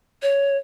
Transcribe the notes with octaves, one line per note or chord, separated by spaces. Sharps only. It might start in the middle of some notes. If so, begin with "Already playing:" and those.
C#5